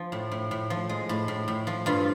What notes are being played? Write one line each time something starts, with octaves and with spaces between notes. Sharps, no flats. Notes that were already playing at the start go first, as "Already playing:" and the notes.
Already playing: F3
A2
A2
A2
F3
G#3
A2
A2
A2
F3
G2 F4